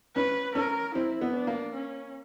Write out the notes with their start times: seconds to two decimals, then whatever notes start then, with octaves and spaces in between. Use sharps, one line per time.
0.16 C#4 B4
0.55 C#4 A#4
0.94 C4 E4
1.21 B3
1.34 D4
1.47 A#3
1.74 C#4